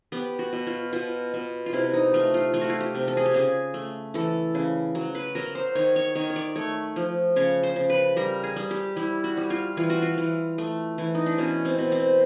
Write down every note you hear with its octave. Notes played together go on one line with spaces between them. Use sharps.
B3 G4
F#4
B2
F4
B2 F4
B2
F4
C3 E4
D#4
A3 F4
F4
A3 F4
F#4
F4
G4
C3
A4
G#4
G4
C#3 G#4
A3
E3 A4
C#3
F#3
B4
F#3 A#4
C5
D#3 C#5
C#5
D#3 C#5
C#5
D5
A3 C#5
F3
C#3 C#5
C5
C#3
B4
G3 A#4
G#4
G3
G4
G3 E4
F#4
G3
F4
E3 F4
F#4
F4
E3
A3
E3
D#4
D4
B2 C#4
C4
B2
C4